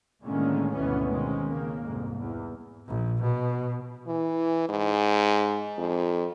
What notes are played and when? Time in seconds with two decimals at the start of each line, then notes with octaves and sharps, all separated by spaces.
0.23 A2 D3 D#3 G#3 A#3 C#4
0.73 G#1 D2 B2 E3 B3 C#4
1.08 B2 D#3 G#3 C4 C#4
1.47 C#3 A#3
1.84 C2 F2 G#2
2.17 E2
2.88 A#1
3.22 B2
4.07 E3
4.69 G#2
5.78 F2